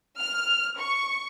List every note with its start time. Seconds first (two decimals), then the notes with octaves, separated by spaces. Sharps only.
0.19 F6
0.78 C#6